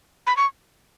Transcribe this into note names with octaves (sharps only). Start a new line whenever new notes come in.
B5
C#6